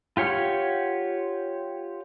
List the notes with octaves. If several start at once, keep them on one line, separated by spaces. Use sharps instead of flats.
F4 G4 C#5 F#5 F6